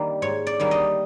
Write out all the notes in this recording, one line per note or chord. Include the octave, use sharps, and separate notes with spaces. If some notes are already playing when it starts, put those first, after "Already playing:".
Already playing: D#3 G3 A#3
G#2 C#5
D5
D#3 G3 A#3
D#5